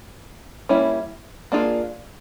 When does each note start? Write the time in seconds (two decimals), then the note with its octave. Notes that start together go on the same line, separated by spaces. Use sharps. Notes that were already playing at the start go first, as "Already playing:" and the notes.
0.69 G3 A#3 C#4 E4
1.52 A#3 D4 F4 G#4